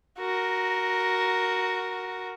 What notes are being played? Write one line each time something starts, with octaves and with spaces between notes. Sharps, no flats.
F#4 A#4